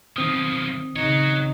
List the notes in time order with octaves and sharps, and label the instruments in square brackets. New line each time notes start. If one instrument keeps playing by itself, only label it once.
[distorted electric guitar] B1 F3 [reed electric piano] D#3 C4 D#6
[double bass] C#3 D#4 [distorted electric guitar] F#4 C#5